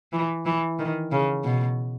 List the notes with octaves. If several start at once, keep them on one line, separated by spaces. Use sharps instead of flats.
E3
E3
D#3
C#3
B2